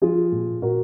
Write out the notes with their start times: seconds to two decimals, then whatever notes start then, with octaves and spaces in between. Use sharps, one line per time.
0.02 F3 F4 G#4
0.32 A#2
0.62 A#2 F#4 A#4